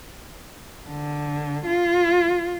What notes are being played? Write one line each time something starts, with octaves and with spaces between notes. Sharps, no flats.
D3
F4